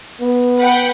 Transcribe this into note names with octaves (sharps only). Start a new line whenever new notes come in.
B3
B4 F#5 G5